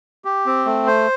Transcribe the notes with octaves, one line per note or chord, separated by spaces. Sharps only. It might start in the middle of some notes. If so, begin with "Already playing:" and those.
G4
C4
A3
C5